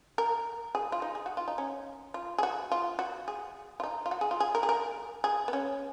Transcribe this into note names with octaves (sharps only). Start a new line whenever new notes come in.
A#4
G#4
F4
D#4
G#4
F#4
F4
D#4
C#4
F4
G#4
F#4
F4
F#4
G#4
F4
D#4
F4
F#4
G#4
F4
G#4
A#4
G#4
A#4
G#4
B3
C#4